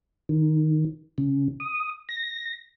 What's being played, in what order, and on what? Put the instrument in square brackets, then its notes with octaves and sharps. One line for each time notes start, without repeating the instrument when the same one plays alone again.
[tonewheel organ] D#3
C#3
D#6
A#6